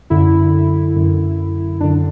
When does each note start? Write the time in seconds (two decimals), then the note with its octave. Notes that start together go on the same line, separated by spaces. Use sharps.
0.10 F#2 D3 E4
0.96 F#2 D3
1.80 F#2 D3 D4